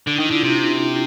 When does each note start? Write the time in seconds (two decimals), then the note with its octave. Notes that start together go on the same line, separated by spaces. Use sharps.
0.07 D3 D4
0.16 D#4
0.20 D#3
0.26 E4
0.31 D3 F4
0.43 C3 D4